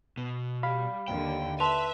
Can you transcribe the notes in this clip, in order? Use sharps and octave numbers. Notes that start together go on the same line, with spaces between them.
B2
G3 F5 B5
D#2 D3 G5
B4 E5 A5 C6 F7